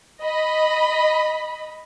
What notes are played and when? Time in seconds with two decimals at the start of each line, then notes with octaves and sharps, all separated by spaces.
0.21 D#5 B5